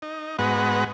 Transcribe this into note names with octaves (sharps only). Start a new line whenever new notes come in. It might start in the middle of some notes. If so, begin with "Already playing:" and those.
D#4
G#2 G#3 B3 F#4 B4 F#5